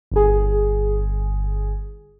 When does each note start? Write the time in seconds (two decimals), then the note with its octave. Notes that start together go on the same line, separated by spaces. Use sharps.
0.11 G1 G#4